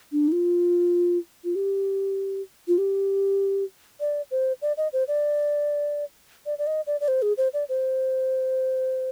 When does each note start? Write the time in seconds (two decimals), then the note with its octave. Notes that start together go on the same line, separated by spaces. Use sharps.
0.12 D4
0.28 D#4
0.32 F4
1.44 F4
1.56 G4
2.68 F4
2.78 G4
4.00 D5
4.31 C5
4.62 D5
4.77 D#5
4.93 C5
5.08 D5
6.46 D5
6.59 D5
6.67 D#5
6.87 D5
7.01 D5
7.08 C5
7.22 G#4
7.38 C5
7.54 D5
7.69 C5